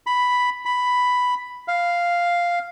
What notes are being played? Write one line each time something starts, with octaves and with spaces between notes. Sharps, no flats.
B5
B5
F5